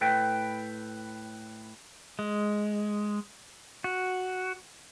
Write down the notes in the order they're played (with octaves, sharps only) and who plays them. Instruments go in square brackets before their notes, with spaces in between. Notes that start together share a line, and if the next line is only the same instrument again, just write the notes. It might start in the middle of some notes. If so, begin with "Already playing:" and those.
[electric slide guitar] A2 A4 B4 G5
[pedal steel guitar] G#3
F#4